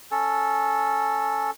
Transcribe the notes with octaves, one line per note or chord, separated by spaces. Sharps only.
C#4 A4